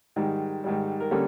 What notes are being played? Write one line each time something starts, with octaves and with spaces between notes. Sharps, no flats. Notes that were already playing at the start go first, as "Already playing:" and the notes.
G#2 D#3 G3
G#2 D#3 G3
A#4
D3 G3 A#3 C#4 A4